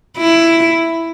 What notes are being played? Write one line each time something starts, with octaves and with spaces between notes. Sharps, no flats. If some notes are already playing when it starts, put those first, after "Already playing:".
E4